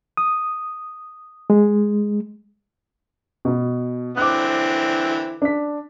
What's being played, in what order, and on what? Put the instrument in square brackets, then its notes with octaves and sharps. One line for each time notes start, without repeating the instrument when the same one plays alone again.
[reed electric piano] D#6
G#3
[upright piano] B2
[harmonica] D3 E3 C4 [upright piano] D6 F#6
[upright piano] D4 B6